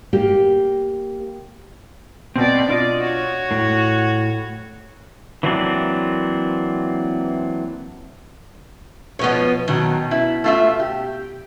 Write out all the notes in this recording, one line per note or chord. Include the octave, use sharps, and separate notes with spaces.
A#3 G4
B2 C4 D5
D4 F4 D5 D#5
F#4 C#5
A2
E3 F#3 A#3 C4 D4
B2 F3 B3 C#5 D#5
B2 D#3 F#3 D#4
E4
A3 F4 E5
G4